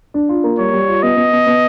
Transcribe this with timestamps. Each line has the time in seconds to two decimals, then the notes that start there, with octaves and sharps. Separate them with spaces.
0.14 D4
0.29 F4
0.44 A#3
0.59 G3 C#5
0.73 G3
0.88 F4
1.03 B3 D#5
1.17 B3
1.33 B3
1.47 B3